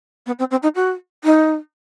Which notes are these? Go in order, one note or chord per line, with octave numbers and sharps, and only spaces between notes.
B3
C4
C4
D#4
F#4
D#4